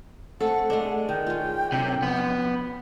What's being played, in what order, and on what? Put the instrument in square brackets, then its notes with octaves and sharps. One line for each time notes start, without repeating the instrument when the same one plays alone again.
[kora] A3 A4 [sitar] C4 [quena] F#5
[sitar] G#3 D5 D#5 [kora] A3 D4
[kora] D#3 [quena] G5
[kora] C#4 F4
[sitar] F#2 A2 A#4 [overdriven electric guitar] C3
[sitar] F2 [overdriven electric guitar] B3